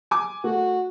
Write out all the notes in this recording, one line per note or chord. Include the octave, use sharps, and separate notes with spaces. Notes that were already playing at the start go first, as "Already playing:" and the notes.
G#5 D6
A3 F#4